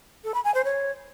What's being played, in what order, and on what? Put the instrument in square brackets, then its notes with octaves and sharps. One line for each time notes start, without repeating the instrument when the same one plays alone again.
[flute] A4
B5
G#5
C5
C#5